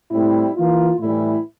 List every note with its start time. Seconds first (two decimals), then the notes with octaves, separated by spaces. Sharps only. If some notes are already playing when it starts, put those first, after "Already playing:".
0.10 A2 G3 C4 E4
0.55 E3 A#3 F4
1.00 A2 E3 G3 E4